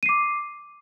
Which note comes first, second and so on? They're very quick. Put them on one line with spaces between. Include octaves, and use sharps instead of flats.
D#7 C7 D6